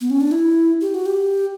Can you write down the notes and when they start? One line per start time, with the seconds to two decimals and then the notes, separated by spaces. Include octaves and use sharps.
0.01 B3
0.10 C#4
0.21 D4
0.31 E4
0.81 G4
0.94 F#4
1.06 G4